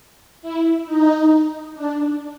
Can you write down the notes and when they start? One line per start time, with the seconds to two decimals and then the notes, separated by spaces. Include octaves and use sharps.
0.42 E4
0.86 D#4
1.75 D4